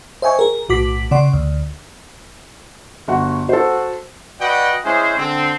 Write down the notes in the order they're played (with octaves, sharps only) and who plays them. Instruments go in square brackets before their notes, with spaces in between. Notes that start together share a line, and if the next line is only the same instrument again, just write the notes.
[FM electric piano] C5 D#5 E5 G5 G#5 C#6
G#4 A#4
B1 A2 F#4 D6 B6
C#3 D5 F#5 C6
D2
[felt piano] G1 F#4 F#5
[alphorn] F#4 [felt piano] A4 C5
[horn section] F#4 B4 D5 D#5 F#5 G5
G#3 C#4 E4 G#4 C5
D3 C4